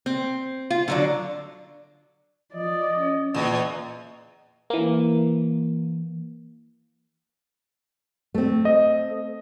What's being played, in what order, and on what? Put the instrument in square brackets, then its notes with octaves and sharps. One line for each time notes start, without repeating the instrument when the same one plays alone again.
[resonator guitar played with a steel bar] C4
F4
D3 F#3 D4
[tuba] F3 [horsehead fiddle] D5 [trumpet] D#5
[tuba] C#4
[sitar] E2 [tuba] A#2 [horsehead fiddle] D#5
[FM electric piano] E3 A#3
[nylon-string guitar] A3 C4
[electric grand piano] D#5